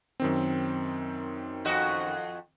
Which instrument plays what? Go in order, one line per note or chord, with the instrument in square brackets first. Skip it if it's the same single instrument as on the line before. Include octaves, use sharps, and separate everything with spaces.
[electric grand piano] F#2 D#3 C4
[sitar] F2 F#4 D#5